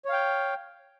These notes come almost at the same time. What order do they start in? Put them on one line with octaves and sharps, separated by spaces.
C#5 F5 G5